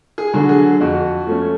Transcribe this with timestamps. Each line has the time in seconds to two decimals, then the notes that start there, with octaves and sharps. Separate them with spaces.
0.18 G#4
0.34 D3 F#3
0.49 G#4
0.81 F2 F#4
1.27 F3 A3 C#4